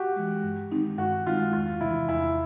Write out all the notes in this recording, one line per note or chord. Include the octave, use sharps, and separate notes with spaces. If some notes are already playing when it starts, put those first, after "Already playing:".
Already playing: F#4 G4
E3 G#3
G2
D#3 G#3 C4 D#4
G2 F#4
D#3 G#3 C4 D#4 F4
E2 F4
C3 E3 E4
E2 E4